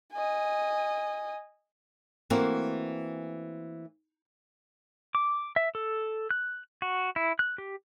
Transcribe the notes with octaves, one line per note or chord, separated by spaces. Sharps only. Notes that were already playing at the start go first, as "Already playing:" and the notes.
D#5 G#5
E3 A3 A#3 C4 F#4
D6
E5
A4
F#6
F#4
E4
F#6
G4